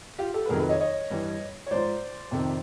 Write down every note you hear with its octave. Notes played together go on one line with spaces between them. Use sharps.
F4 G4
G4 A4
B4
F2 C3 D#3 F#3 G#4 A#4
A4 B4
C#5 D#5
C#5 D#5
G2 E3 G3
C#5
G#2 F3 C5 D5
F2 C3 D#3